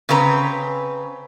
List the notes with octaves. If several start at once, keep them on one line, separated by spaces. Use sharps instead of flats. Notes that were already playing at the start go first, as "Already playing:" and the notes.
C#3 C4 B4 A#5